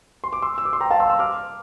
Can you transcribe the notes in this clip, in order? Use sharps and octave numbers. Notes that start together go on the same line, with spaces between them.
C6
D6
C6 E6
E6
D6
C6
G5 A#5
F5 A5
C6 E6
C6 E6
D6 F6